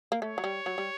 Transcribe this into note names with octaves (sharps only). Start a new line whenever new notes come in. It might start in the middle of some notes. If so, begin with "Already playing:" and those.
A#3
A3 C#5
F#3
G3
F#3
G3